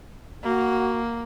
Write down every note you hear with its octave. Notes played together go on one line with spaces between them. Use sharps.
A#3 F#4